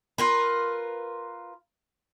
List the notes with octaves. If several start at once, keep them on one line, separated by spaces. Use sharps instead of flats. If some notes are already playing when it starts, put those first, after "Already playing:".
F4 A#4 B4